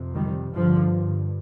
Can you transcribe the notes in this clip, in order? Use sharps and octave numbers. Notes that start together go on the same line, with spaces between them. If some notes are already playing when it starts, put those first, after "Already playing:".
Already playing: F2 C3
D#3 G3
G2 D3 F3